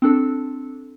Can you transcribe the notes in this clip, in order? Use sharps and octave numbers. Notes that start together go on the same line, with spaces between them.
C4 D4 A4